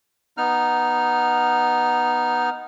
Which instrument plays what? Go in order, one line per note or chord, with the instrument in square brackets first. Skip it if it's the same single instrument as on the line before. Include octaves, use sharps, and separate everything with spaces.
[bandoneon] B3 D#4 F6